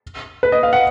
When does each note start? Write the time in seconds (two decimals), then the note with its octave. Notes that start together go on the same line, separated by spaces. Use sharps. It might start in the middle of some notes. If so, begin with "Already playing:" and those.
0.43 B4
0.52 D#5
0.63 F5
0.73 F#5